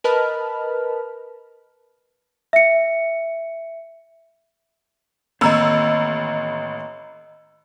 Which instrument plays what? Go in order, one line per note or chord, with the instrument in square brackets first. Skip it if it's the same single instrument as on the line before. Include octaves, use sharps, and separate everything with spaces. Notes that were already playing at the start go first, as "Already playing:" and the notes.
[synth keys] A#4 B4 D#5 A5 B5 F6
[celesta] E5 C#7
[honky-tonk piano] A1 E6 [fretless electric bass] D#3 A#3 C4 [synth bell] D#5 A#5 B5